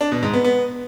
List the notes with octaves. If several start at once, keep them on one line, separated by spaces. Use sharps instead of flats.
D4
B2
G#2
B3
B3